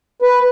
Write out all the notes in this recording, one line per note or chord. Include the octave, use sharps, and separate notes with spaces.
B4